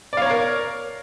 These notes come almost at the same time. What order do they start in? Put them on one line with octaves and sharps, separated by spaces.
D5 F5 C#5 A#5 A#4